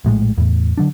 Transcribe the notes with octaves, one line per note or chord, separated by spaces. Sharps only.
A#1 A2 F3 G#3
E2 A2
D3 F#3 D4